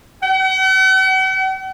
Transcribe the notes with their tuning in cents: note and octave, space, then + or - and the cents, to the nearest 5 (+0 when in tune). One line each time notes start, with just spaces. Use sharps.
F#5 +45